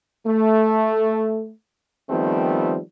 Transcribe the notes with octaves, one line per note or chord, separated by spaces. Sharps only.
A3
D#3 F3 G3 A3 B3 C4